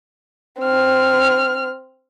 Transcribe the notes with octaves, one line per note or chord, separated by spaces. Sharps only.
C4 F6